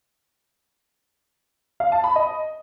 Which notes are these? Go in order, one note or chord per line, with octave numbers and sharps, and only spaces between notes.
F5
A5
B5
D#5